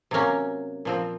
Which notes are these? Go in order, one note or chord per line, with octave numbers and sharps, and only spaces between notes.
C3 F#3 A#3 C#4
A#2 F3 C4